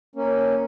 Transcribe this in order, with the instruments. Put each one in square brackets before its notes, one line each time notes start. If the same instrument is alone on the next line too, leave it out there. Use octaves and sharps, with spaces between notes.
[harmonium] A#3 C#4